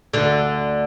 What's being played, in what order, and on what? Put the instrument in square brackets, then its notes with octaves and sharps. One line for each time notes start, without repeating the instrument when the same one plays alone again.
[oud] D2 D3